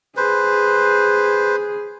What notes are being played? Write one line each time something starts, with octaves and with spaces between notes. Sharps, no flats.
G#4 B4 C5